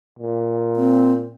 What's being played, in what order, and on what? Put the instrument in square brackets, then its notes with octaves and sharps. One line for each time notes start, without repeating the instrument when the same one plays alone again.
[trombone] A#2
[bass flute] C4